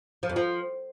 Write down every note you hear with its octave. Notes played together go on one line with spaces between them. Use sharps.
F3
F2
F3